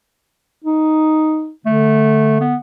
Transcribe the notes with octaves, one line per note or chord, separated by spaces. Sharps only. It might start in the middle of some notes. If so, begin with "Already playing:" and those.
D#4
D3 A3
B3